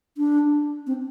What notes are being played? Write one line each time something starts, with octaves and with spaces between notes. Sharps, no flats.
D4
C4